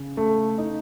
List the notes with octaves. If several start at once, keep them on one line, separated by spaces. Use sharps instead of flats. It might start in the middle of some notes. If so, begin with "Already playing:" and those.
Already playing: C#3
A3
D#4